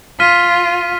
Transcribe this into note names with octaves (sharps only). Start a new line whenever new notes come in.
F4 F6 B6 D#7